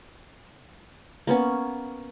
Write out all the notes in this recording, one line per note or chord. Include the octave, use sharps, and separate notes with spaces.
A#3 B3 C#4